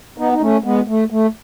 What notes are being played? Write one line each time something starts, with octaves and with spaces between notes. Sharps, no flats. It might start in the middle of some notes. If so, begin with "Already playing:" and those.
B3 D#4
D#4
A3 C#4
G#3 B3
A3
A3